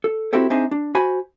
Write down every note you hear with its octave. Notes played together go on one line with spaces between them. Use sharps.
A4
C4 E4 F#4 G4 A4 C5
C4 D4 D#4 G#4 C5 E5
D4
F#4 C5 G#5 B5